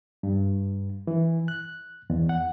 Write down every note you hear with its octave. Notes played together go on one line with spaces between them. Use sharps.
G2
E3
F#6
E2
F#5